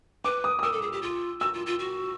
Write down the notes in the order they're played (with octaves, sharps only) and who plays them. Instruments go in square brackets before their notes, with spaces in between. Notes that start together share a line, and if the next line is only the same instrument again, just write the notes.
[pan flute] B4 [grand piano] D6
[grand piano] D#6
D#6
[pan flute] A#4 [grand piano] E6
[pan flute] A4
G#4
G4
F4
[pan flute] F#4 [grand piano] E6
[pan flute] F4
F4
F#4